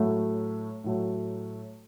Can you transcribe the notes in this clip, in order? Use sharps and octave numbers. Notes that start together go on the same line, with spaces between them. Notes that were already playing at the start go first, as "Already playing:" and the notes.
Already playing: A2 F#3 A3
A2 F#3 A3